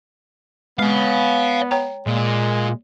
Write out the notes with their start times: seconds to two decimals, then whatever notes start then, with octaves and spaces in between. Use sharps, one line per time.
0.79 G#3 B3 C#5 F5
1.71 C#5 G5 A#5
2.07 A#2 G#3